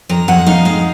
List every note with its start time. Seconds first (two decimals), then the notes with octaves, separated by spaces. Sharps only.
0.09 F2 A#5
0.28 F2 F#5
0.47 D#4 F5
0.65 G#3 F5